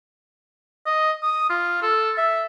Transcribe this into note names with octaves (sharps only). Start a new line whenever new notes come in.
D#5
D#6
F4
A4
E5